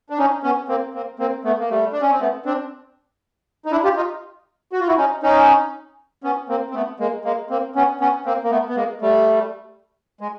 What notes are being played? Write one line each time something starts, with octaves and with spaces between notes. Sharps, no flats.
D4
C#4 D#4
B3 C#4
A#3 C4
A#3 C4
A#3 C4
A3 B3
A#3
G3 A3
D4
C#4
C4
A3 B3
C4 D4
D#4
D4 E4
F4 G4
D#4 F4
F#4
F4
E4 F#4
C#4 D#4
C#4 D#4
B3 C#4
A#3 C4
C4
A3 B3
G#3 A#3
G#3 A#3
A#3 C4
B3 C#4
B3 C#4
A#3 C4
A#3
A3 B3
B3
G#3 A#3
G3 A3
G#3